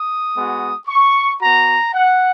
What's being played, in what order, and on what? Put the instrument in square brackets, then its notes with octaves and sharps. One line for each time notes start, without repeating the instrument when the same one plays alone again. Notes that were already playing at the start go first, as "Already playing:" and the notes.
Already playing: [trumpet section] D#6
G#3 B3 F#4
C#6
B3 F#4 A#5
F#5